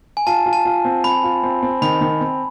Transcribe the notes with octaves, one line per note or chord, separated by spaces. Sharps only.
G#5
F4 A5
F4
A5
F4
C4
C4 B5
F4
C4
C4
D#3 B5
D#3
C4